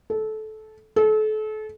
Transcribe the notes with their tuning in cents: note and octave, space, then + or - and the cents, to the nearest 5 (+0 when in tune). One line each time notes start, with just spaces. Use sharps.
A4 -20
A4 -35